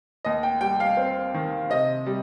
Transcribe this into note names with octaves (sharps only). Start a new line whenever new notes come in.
D#2 D#5
G5
G3 G5
F5
C4
D#3
C3 D#5
G3